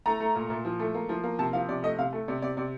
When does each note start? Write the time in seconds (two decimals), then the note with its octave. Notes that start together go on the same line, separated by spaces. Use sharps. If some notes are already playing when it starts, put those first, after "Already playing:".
0.06 A3 A#5
0.20 A3
0.35 A#2
0.50 A#2
0.65 F3
0.79 A3
0.94 A#3
1.09 F3
1.24 A#3
1.39 C3 A5
1.53 F3 F5
1.68 C3 D5
1.83 A3 D#5
1.98 C3 F5
2.13 A3
2.28 C3 D5
2.42 C3 D5
2.57 C3 D5